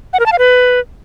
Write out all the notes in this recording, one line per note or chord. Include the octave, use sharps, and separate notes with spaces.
F#5
A#4
A5
F5
B4